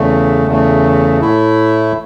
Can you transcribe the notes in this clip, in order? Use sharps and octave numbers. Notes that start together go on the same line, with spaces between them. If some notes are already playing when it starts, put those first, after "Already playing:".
Already playing: E2 C#3 A3
E2 C#3 A3
A2 A3 E4